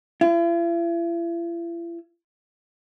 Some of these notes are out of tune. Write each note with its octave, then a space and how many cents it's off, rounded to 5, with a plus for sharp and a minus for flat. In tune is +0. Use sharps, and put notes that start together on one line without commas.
E4 +45